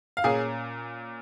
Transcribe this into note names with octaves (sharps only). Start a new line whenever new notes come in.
F5
A#2 A#3 C#4 G#4 G#5